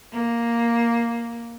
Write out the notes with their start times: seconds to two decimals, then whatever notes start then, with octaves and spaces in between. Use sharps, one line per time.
0.12 A#3